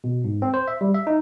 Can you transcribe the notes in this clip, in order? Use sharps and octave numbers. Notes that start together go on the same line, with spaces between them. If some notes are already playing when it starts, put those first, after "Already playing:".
B2
G#2
C4
C5
E5
G3
E5
D#4